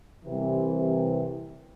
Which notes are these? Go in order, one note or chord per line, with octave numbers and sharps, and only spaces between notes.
C2 C3 E3